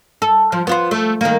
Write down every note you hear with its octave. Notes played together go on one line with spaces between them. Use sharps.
A4
F3
B3 F4 C5
A3
D#3 A#3